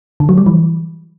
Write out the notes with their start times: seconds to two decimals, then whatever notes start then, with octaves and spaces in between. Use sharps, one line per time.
0.20 D3
0.29 F#3
0.38 G3
0.46 E3